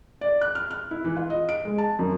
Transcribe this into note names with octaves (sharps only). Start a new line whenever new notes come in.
D5
F#6
F6
F6
E4
E3
F4
D#5
D7
G#3
A5
F#2